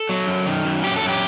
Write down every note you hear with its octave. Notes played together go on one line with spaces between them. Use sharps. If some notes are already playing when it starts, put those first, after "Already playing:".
Already playing: A4
F#3
F#2
D#3
F#2
F#3 G4
A4
F#2
G4